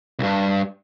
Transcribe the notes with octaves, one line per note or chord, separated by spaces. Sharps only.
C2 G2